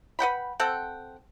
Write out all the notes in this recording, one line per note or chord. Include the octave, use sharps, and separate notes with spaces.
B4 F#5 G5 B5
C4 A4 F#5 G5